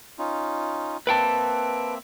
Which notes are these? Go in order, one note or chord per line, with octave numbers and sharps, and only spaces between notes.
C#4 D#4 F4
A#3 C4 B4 E5 G5 A5